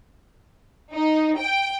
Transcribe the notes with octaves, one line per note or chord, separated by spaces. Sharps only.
D#4
G5